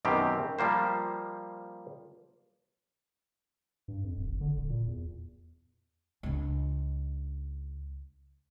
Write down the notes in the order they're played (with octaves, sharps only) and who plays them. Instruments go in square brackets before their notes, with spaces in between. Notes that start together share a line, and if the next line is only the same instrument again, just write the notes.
[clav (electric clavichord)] F#2 B2 D#3 C4 G4
F3 G3 A#3 C5
[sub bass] G2
F2
D1
G#1
D3
D1
A#2
E2
[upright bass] C#2 D4